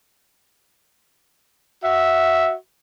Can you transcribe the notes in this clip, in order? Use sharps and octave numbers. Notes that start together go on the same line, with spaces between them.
F#4 E5